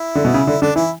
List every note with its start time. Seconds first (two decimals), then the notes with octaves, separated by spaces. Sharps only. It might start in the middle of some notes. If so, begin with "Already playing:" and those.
Already playing: E4
0.15 D3
0.25 B2
0.34 C#3
0.47 D3
0.62 D3 D4
0.76 E3 E4